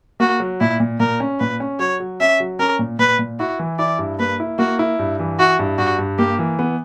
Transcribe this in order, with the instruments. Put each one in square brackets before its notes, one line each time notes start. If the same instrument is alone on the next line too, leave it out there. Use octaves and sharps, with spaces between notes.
[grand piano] A#3 [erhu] F#4
[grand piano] F#3
[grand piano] A#2 [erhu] E4
[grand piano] A#2
[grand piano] A#2 [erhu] A#4
[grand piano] C#4
[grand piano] A#2 [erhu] B4
[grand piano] C#4
[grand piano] F#3 [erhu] C#5
[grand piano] F#3
[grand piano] C#4 [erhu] E5
[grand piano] F#3
[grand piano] C#4 [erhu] A#4
[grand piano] A#2
[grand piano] A#2 [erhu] B4
[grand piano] A#2
[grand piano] E4 [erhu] F#4
[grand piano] E3
[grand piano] E4 [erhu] D5
[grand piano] G2
[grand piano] A#3 [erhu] B4
[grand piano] E4
[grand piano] A#3 [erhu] F#4
[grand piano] E4
G2
E3
[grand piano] E4 [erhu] F#4
[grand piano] G2
[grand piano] G2 [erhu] F#4
[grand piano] G2
[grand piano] A#3 [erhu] G4
[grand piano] E3
B3